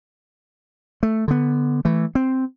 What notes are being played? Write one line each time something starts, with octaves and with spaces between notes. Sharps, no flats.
A3
D3 B3
E3 A3
C4